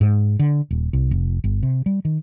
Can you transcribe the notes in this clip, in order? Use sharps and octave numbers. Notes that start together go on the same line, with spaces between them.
G#2
D3
D#1
C2
F1
G1
C3
G3
D#3